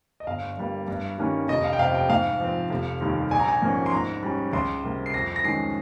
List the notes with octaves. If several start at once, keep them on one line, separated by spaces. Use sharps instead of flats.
D#5
G1 F5
G2 G3 A#3
G2
D#3 G3 A#3 C#4
F1 D#5
F5
G5
F2 C3 F5
G5
G#2 F5
F3 C4
F1
D#2 D#3 G3 A#3
A#1 G#5
A#5
G#5
G#2 F3 A#3 C#4
C6
G#2 A#5
G3 C#4
C#2 C6
C3 G3 A#3
C7
F2 A#6
A#6
D#3 G#3 C#4 C7